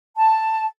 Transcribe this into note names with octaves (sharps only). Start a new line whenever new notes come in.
A5